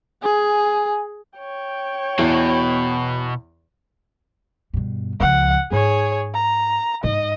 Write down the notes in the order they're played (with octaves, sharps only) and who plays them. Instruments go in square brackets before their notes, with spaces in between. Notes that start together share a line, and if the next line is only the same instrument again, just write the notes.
[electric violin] G#4 [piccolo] G#5
[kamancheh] C#5 G5
[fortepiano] E2 [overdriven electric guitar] B2
[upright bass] G2 B2
[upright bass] C#2 F3 [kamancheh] F#5
[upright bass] G#2 D#4 [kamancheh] G#4 C#5
[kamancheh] A#5
[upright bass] G#2 [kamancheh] D#5